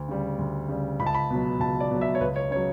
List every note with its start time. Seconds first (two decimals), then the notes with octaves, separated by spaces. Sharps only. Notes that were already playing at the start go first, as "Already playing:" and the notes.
Already playing: D2
0.08 C#3 G3
0.39 D2
0.68 C#3 G3
1.00 C#2 B5
1.06 A5
1.14 B5
1.30 B2 F#3
1.60 C#2 A5
1.80 D5
1.91 B2 F#3
2.01 E5
2.15 C#5
2.21 C#2 B4
2.36 C#5
2.51 C#3 C#5
2.56 F#3